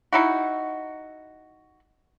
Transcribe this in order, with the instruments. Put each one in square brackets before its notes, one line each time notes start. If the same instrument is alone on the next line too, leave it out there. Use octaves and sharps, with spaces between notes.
[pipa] D#4 E4 F#4